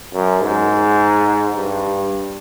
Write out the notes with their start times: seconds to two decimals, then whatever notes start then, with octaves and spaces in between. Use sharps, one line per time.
0.14 F#2
0.42 G#2
1.56 G2